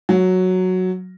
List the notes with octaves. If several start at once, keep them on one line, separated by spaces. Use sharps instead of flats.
F#3